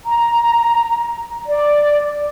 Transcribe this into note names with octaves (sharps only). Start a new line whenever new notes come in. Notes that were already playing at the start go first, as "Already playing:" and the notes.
A#5
D5